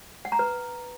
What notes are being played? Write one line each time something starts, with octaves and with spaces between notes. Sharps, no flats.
F#5
A#5
B4